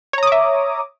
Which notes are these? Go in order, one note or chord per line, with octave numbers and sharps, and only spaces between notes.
C#5 E5 A#5 D6 D#6